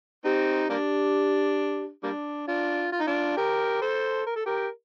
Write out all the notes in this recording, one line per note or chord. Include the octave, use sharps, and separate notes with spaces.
C4 D#4 G4
G3 A#3 D4
G3 A#3 D4
D4 F4
F4
D#4
D4 F4
G4 A#4
A4 C5
A#4
A4
G4 A#4